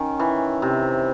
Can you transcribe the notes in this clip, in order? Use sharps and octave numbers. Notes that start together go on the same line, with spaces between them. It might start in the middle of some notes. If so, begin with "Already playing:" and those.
Already playing: D#3 C#4
E3
C3